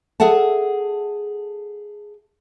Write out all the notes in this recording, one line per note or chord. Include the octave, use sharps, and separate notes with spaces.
G#4 A4 E5 F#5 A5